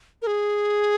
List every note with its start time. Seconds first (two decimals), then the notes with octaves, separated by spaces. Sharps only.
0.22 A#4
0.27 G#4